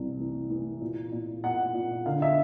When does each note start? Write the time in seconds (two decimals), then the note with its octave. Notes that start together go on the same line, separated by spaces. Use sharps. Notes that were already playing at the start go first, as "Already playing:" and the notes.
Already playing: C2 E3
0.19 E3
0.50 E3
0.81 A#2
1.12 A#2
1.43 A#2 F#5
1.74 A#2
2.06 D3 F5
2.22 E5